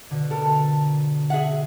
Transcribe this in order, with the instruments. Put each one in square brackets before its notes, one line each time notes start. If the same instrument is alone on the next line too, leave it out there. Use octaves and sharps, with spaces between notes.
[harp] B2 D3
[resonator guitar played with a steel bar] A4 A#4
G#4 E5 F#5